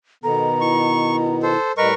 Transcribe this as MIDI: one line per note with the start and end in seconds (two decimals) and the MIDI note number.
0.24 1.54 47
0.24 1.54 51
0.24 1.54 59
0.24 0.48 69
0.24 1.36 82
0.61 1.58 64
0.61 1.16 85
1.43 1.72 69
1.43 1.72 72
1.78 1.92 45
1.78 1.92 55
1.78 1.94 70
1.78 1.94 71
1.78 1.88 75
1.78 1.94 85